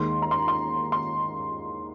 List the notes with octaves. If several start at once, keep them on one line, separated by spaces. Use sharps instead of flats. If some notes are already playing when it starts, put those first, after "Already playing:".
Already playing: D#2 D#3 G#3 D#4 C6
A#5
C6
C6
C6